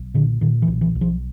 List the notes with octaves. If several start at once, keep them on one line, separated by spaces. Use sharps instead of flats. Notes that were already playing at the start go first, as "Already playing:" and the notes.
Already playing: B1
A#2 D3
A#2 D#3
E3
B1
E3
B1
F3